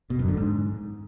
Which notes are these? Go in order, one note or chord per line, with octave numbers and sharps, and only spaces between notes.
B2
F#2
D3
G#2